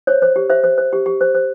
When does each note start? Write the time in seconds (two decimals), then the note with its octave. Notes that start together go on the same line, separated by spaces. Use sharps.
0.07 C5 C#5
0.22 C5
0.36 G4
0.50 C5 E5
0.64 C5
0.78 C5
0.93 G4
1.06 G4
1.21 C5
1.35 C5